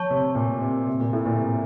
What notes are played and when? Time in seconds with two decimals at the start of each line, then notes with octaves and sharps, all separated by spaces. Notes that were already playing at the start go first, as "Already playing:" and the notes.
Already playing: C#5 A5 C#6
0.10 C3
0.35 A#2
0.61 C3
0.87 C3
1.00 A#2
1.13 A2
1.26 A#2
1.38 C3